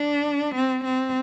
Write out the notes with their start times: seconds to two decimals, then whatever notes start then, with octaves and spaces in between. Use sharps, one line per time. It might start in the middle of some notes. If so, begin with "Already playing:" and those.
Already playing: D4
0.55 C4
0.85 C4